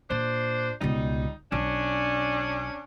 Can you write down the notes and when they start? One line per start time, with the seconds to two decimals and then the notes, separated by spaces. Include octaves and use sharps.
0.10 A#2 D4 C5
0.81 C#2 B2 G3 D#4
1.52 B1 C#4 D4